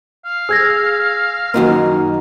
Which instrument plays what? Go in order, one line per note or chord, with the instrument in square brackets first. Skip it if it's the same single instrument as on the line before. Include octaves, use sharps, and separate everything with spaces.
[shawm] F5
[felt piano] G#4 [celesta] E6 G#6 A#6
[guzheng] F#2 D#3 F4 [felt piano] A#3 D#4 F#4